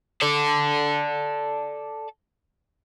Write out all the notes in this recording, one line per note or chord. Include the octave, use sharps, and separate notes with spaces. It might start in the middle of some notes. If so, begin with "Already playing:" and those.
A4 D5